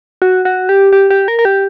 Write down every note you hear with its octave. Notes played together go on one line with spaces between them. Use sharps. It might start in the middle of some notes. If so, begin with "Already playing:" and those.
F#4
F#4
G4
G4
G4
A#4
A#4
G4